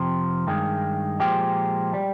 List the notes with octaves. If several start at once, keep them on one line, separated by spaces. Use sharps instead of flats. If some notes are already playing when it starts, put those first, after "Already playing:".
Already playing: F2 C3 F3
G2 D#3 G#3
A#2 F3 G#3 G4
G3